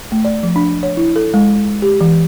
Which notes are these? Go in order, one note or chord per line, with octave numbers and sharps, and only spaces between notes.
A3
D5
F3
D4
C#5
E4
A4
G#3
G4
E3